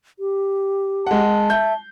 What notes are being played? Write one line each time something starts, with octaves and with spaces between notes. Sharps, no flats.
G4
G#3 F#5 A5
E5 G6